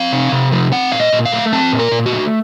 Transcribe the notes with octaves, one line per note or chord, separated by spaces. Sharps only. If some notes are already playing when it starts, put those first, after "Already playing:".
Already playing: C4 F5
C3
C3
F3
C4 F#5
A#2 F5
D#5
A#2
F5
A3
C4 A5
A#2
A#4
A#2
F#4
A3